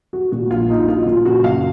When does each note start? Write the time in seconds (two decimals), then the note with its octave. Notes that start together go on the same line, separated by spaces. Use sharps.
0.13 F#3 F#4
0.32 A#2 F#4
0.51 A#1 F4
0.69 A#1 D#4
0.88 F#3 F4
1.06 A#2 F4
1.25 C#3 F#4
1.43 F#2 F5